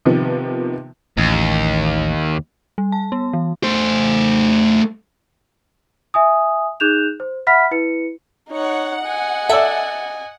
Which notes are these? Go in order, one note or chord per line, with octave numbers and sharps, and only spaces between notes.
C3 D#3 F3 B3
A1 D#2
G3
A5
B3
E3
A3 C5
E5 G#5 D#6
D#4 G#4 F#6 G6 E7 F7
C5
E5 F#5 B5 F6 B6
E4 B4 C#7
D#4 C#5 F#5
D#5 G#5
A4 D5 E5